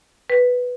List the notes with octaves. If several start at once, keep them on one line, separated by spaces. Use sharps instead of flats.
B4